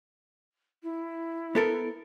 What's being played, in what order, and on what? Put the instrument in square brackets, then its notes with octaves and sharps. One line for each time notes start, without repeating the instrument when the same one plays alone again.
[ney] E4
[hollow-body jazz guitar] B3 A4 A#4